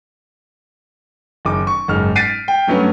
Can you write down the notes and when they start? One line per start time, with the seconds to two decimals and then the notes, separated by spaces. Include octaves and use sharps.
1.45 F#1 D#3 D6
1.67 C#6
1.88 F#1 G#2 F6
2.16 A6 B6 C7 D7 D#7
2.48 G5
2.67 G2 F#3 A3 B3 C#4